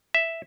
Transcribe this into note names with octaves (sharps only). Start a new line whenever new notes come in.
E5